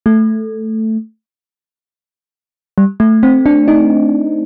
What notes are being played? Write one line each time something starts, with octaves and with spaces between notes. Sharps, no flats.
A3
G3
A3
C4
D4
D#4